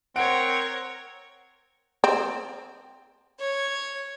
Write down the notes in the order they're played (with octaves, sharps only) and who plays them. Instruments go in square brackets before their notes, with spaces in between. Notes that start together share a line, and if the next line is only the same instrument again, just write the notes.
[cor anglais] C4 [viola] A#4 C#5 [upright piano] F#5 D7
[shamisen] C4
[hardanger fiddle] C#5